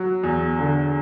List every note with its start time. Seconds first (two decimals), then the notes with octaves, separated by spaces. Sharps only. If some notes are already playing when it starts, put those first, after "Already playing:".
Already playing: F#3
0.23 E2
0.59 D3